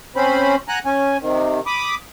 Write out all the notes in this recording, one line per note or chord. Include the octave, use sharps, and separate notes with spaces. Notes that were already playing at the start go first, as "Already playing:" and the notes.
C4 C#4 C5 B5
F#5 G#5 A#5 F#6
C#4 G#5
C3 D#3
B5 D6 D#6